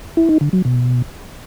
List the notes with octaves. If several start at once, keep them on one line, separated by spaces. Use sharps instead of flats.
E4
D#4
D3
F#3
B2